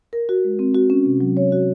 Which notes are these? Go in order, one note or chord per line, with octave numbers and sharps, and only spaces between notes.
A#4
F#4
G#3
C4
F#4
C#4
C3
F#3
C#5
F#4